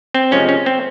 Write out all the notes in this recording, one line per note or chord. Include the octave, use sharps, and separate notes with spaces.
C4
C3 F3 G#3 C#4
C#4
C4